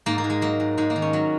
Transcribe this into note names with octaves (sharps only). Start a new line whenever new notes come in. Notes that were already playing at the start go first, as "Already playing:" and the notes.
G#2 A#3
A#3
G#2
G#3
F#3 A#3
G#2
G#2 G#3
A#3
D#3
C#4
F#3